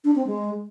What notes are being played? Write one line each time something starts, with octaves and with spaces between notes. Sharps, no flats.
D4
C4
G#3